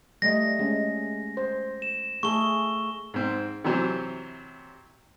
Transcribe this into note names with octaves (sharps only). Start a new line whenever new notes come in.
G3 A3 D#5 A#6
G#3 C#4
C5
E7
A3 G#4 A4 C#6 G7
G#2 C4
C3 E3 F#3 C4